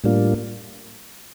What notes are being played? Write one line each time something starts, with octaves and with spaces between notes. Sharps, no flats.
A2 G3 A#3 D4 F4